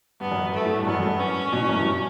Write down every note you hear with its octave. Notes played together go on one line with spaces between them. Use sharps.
G2 B3
F#2
G2 A3
A2
G2
F#2 B3
F#2
G2
C#4
B2
A2
F#2
G2